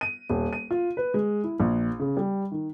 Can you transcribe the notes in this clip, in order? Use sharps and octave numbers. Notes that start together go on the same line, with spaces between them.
D#7
D#1
D#7
F4
B4
G#3
E4
A#1
C#3
G3
D#3